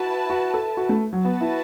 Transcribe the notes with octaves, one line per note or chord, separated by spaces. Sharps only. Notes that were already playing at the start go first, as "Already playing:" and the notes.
Already playing: E4 F#4 B4 A5
F#4
A4
F#4
A3
F#3
B3 F#4 B4 A5
E4